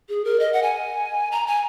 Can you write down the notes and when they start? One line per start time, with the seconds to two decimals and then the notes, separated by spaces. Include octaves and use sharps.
0.09 G#4
0.25 A#4
0.40 D#5
0.53 F#5
0.63 G#5
1.31 A#5
1.47 G#5